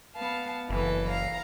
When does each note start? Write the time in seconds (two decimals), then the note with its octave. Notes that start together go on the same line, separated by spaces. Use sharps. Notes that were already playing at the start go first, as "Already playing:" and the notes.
0.15 B3 F5 A5
0.70 F#1 E3 A4 B4
1.07 F5 A#5